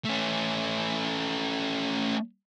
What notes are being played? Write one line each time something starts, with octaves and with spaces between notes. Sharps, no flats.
A3 C#4